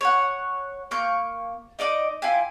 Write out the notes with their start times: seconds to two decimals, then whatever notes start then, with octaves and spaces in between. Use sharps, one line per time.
0.01 C#5 F#5
0.91 A#3 C#6 G6
1.79 D#4 D5 D#5 D6
2.22 E4 F4 G4 G#5